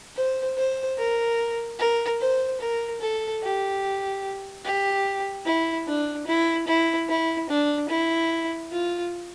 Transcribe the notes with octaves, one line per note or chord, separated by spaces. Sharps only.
C5
C5
A#4
A#4
C5
A#4
A4
G4
G4
E4
D4
E4
E4
E4
D4
E4
F4